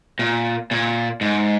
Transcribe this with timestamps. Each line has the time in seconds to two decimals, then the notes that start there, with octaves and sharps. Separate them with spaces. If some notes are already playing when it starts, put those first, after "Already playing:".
0.19 A#2
0.71 A#2
1.21 G#2